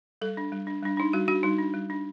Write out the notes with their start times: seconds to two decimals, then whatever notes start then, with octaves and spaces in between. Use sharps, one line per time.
0.21 G3 A4
0.37 D4
0.52 G3
0.67 D4
0.83 G3 D4
0.97 D4 D#4
1.13 G3 F#4
1.28 D4 F#4
1.43 G3 D#4
1.59 D4
1.74 G3
1.90 D4